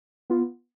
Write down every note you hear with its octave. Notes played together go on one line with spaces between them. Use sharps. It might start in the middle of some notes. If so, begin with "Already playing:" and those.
B3 F4